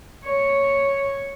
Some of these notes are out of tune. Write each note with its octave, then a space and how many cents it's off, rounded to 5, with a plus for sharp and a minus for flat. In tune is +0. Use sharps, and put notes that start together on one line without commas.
C#5 +0